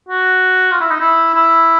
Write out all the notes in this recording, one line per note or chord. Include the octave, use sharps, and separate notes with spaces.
F#4
F4
E4
D#4
E4
E4